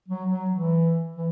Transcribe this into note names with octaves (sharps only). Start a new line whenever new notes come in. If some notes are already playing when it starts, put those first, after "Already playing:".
F#3
F#3
E3
E3